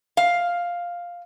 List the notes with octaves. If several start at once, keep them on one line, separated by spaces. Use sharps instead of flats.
F5